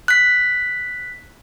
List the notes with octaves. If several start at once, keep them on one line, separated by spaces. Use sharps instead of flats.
F#6 B6